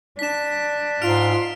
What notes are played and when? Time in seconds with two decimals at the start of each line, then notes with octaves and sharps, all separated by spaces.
0.19 D4 B6 E7
1.02 G#2 F4 C6 F6 D7 F7